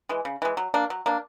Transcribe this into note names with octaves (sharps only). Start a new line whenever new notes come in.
E3 G#3
C#3
E3 G#3
F#3
A#3 D4
F#3
A#3 D4